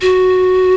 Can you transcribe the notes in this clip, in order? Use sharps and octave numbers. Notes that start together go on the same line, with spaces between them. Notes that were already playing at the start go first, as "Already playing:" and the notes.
F#4